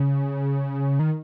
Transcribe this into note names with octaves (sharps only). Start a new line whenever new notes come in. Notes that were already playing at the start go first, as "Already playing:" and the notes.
Already playing: C#3
D#3